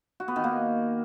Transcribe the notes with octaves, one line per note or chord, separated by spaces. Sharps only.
F#4
B3
D#3
A#3